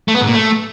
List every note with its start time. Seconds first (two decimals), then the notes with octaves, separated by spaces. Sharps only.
0.08 A3
0.14 B3
0.21 G#2
0.27 A#2
0.33 A3